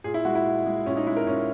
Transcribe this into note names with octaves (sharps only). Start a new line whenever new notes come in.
A#2 G#4
E4
G#3 F#4
E4
A#2
G#3
A#2 C#4
D#4
G#3 E4
A#4
A#2 C#4